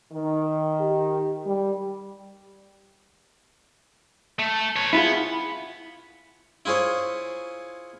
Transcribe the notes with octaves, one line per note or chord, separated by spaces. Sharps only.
D#3
G4
G3
A3
B4 C#5
B3 E4 F4 G#4
E4 F4 G#4 C5 C#5